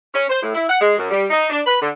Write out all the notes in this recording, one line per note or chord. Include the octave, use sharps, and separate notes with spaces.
C#4
C5
A2
E4
F#5
G#3
F#2
G3
D#4
D4
B4
D3